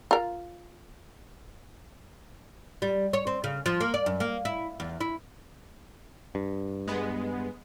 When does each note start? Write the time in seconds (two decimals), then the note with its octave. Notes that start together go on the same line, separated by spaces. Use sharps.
0.11 F4 A#4
2.82 G3
3.13 C#5
3.27 C4
3.44 C#3
3.66 F3
3.81 A#3
3.94 D5
4.06 F#2
4.20 A#3
4.45 E4
4.80 E2
5.01 E4
6.35 G2
6.88 G#3 B3